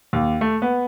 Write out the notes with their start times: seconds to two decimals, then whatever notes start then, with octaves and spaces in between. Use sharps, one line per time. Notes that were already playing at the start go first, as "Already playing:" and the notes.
0.13 D#2
0.41 A3
0.62 B3